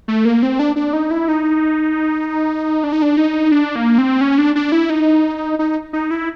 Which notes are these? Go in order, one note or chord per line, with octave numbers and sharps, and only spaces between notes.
A3
A#3
C4
D4
D4
D#4
E4
D#4
D4
D#4
D4
D#4
D4
A#3
C4
C#4
D4
D4
E4
D#4
D#4
D#4
E4